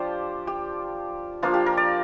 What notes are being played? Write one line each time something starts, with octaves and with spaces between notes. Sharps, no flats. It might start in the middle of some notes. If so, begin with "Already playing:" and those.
Already playing: F3 D4 F4 G4 C5 D5
G4
F3 A#3 D4 F4
G4
A#4
D5